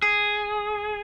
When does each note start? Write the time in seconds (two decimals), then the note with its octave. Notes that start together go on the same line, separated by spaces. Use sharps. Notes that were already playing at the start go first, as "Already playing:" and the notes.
0.02 G#4